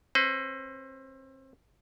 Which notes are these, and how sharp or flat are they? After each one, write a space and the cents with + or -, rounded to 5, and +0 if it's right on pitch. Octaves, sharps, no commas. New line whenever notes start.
C4 +35 B4 +45